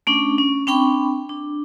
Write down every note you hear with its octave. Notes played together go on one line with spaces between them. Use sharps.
A3 C#4 D4
C#4
C4 D4 G5 B5 C#6
D4